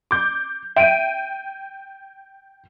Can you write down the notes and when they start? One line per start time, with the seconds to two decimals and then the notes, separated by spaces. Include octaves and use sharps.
0.11 D6 G6
0.76 E5 G5 D7 D#7